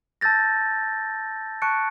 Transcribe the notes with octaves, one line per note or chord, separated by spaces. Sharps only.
A5 E6 G6 A6 A#6
A5 C#6 F#6 C#7 D7